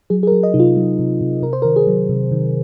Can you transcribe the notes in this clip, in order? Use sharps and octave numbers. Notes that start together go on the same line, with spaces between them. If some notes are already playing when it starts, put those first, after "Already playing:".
F#3 G#4
G#4
A#4
F#3
D#5
C3 D#4
F4
F#3
C3
C3
C3 A#4
C5
A#4
D#3
G#4
F#3
C3
D#3